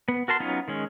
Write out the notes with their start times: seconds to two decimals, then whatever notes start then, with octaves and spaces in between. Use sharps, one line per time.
0.08 B3
0.28 F#4 A#4 A5 C6
0.40 F#3 B3 C#4 D#4 F4
0.68 D#3 G#3 C#4